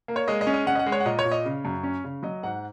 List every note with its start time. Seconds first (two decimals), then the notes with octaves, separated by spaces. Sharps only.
0.08 A#3
0.16 C#5
0.28 G#3 D#5
0.41 D#5
0.47 C#4
0.54 D#5
0.66 C#4 F#5
0.75 D#5
0.79 F#5
0.86 G#3
0.92 C#5
1.00 F#5
1.05 A#2 D#5
1.19 C#5
1.25 A#2
1.32 D#5
1.45 C#3
1.65 F#2
1.83 C#4
2.04 C#3
2.23 F#3 D#5
2.43 G#2 F#5